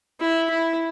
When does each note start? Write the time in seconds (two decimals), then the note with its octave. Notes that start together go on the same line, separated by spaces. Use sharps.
0.20 E4
0.50 E4